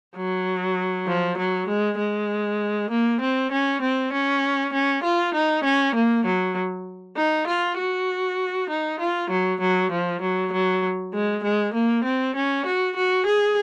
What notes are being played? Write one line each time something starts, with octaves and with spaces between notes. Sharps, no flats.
F#3
F3
F#3
G#3
G#3
A#3
C4
C#4
C4
C#4
C#4
F4
D#4
C#4
A#3
F#3
D#4
F4
F#4
D#4
F4
F#3
F#3
F3
F#3
F#3
G#3
G#3
A#3
C4
C#4
F#4
F#4
G#4